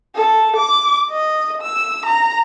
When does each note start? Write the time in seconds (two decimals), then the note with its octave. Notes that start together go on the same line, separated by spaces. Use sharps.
0.15 A4
0.57 D6
1.10 D#5
1.62 E6
2.05 A#5